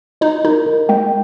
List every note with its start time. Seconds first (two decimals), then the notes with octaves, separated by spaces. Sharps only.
0.21 D#4 D#5
0.45 D#4 A#4
0.66 A#4
0.89 G#3 G5